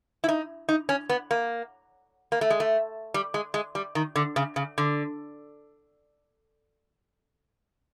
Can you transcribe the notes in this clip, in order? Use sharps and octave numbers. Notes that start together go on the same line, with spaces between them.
E4
D#4
D#4
C#4
B3
A#3
A#3
A3
G#3
A3
G3
G#3
G#3
G3
D#3
D3
C#3
C#3
D3